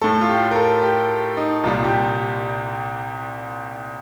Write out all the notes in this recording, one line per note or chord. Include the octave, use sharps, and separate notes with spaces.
A2 A3 A4
F4
G4
A#4
A4
G4
D#4
C2 A#2 G3 F4
G4